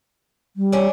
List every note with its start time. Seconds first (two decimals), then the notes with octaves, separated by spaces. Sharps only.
0.56 G3
0.72 C#4 D4